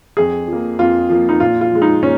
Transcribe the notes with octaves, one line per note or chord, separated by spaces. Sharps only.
F2 G#4
F3 A#3
F2 F4
F3 A#3
D#4
A#2 F4
F4
F3 G#3
D#4
A#2 C#4